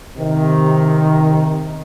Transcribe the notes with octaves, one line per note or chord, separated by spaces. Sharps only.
C3 D#3